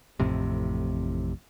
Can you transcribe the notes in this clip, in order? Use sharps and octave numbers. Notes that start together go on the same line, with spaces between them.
A1 F2 A2 C3